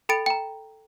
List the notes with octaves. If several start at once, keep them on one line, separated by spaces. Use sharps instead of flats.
A4 G5 B5 A6 D7
G5 A#5